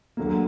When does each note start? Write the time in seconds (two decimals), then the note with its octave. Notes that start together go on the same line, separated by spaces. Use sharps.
0.17 D2 D3 F#3 A#3